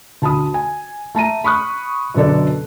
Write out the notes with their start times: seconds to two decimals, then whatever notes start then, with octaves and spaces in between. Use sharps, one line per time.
0.22 D2 A5 B5 D#6
0.54 G#5
1.15 A3 A5 A#5 D#7
1.44 B5 C#6 D#6 F#6
2.14 F#2 B2 D3 A4 D5